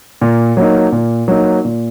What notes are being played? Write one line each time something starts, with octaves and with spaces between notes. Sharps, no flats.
A#2
F#3 A#3 D#4
A#2
F#3 A#3 D#4
A#2